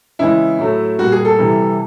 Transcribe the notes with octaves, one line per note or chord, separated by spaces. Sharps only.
C#3 E3 G#3 E4
A2 F#3 A3
A#2 G3 F#4
G#4
A4
C3 E3 G3